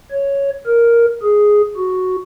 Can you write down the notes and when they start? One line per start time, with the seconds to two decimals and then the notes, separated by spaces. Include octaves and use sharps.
0.11 C#5
0.67 A#4
1.23 G#4
1.77 F#4